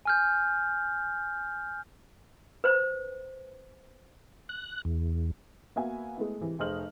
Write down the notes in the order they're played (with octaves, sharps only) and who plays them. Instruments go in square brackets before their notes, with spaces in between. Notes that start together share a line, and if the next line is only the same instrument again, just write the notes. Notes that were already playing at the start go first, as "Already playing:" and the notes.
[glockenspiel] G#5 F6 G6
[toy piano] B4 C5
[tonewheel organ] F#6
E2
[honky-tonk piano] A#3 B3 F#4 E5 F5 G#5
G#3 A3 B3 E4
C3 E3 G#3
F1 G#4 C5 D#5 F6 F#7